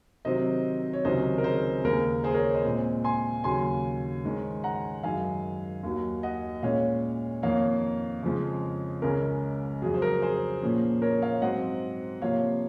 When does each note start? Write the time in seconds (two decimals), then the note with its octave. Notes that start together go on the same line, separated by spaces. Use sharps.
0.25 C3 D#3 F#3 C4 C5 D#5
0.93 C#5
1.05 C#2 C3 D#3 F#3 C#4 C5 D#5
1.38 A#4
1.44 G#4 C5
1.84 D#2 C#3 G#3 A#4
2.24 G#4 C5
2.34 A#4 C#5
2.54 C5 D#5
2.64 A#2 G#3 C4
3.04 G#5 C6
3.44 D#2 C#3 F#3 C#4 G#5 C6
4.24 G#2 D#3 G#3 C#4
4.64 F#5 A#5
5.03 F#2 D#3 G#3 F5 G#5
5.83 D#2 D#3 F#3
6.23 D#5 F#5
6.63 A#2 G#3 C#4 C#5 F5
7.43 F2 D#3 A#3 C#5 F5
8.23 F2 C#3 F3 G#3
9.02 C#2 C#3 G#3 C#4 A#4
9.82 F2 C#3 F#3 G#4
9.94 C5
10.02 A#4
10.22 G#4 C5
10.62 A#2 F3 A#3 C#4
11.02 A#4 C#5
11.22 C#5 F5
11.42 G#2 F#3 C4 D#5 F#5
12.21 C3 F3 A#3 C#5 F5